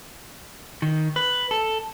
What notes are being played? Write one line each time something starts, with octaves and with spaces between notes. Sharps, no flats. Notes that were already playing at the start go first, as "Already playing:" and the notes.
D#3
B4
A4